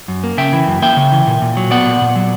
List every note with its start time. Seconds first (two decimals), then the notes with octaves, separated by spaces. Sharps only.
0.08 F#2
0.24 A#3
0.38 C#3 E5 G5
0.53 E3
0.68 F#2
0.82 A#3 E5 G5
0.97 C#3
1.12 E3
1.27 A#2
1.42 A#2
1.57 F#3
1.71 B3 D5 F#5
1.86 A#2
2.01 A#2
2.16 F#3